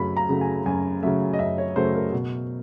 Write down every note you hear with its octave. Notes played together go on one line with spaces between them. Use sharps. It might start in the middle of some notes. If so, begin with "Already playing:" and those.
Already playing: F#2 C#3 F#3 A3 B5
A#5
C#3 F#3 A3
G#5
F#2 G#5
C#3 F#3 A3 E5
D#5
F#2 E5
C#5
C#3 F#3 A3 C5
A#4
B2